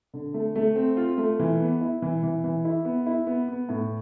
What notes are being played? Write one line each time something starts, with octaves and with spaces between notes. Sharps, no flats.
D3
A3
A3
C4
F4
A3
E3
B3
E4
E3
E3
E3
E4
B3
E4
B3
B3
A2